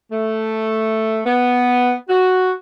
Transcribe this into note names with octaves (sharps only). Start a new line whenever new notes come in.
A3
B3
F#4